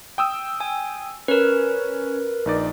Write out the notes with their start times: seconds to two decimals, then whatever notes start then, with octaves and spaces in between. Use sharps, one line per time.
0.18 G5 D#6 E6
0.60 G#5
1.28 C#4 A#4 B4
2.46 A#1 D#4 D5